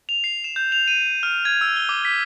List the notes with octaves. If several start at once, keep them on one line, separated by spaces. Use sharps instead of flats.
F7
C7
E7
G6
F7
D#7
F6
G#6
E6
G7
D6
B6